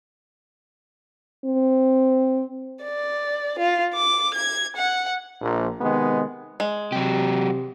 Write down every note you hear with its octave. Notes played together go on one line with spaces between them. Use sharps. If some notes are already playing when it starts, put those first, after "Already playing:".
C4
D5
F4
D6
G#6
F#5
A#1
C3 D#3 G#3 B3
G#3
C3 F#3 G4